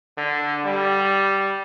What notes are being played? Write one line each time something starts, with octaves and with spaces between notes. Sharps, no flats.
D3
G3